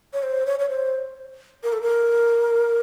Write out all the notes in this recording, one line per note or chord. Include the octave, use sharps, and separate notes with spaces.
C#5
C5
C#5
C#5
C5
A#4
A4
A#4